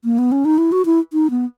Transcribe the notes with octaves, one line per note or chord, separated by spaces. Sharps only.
A#3
B3
C#4
D#4
E4
F#4
E4
D#4
B3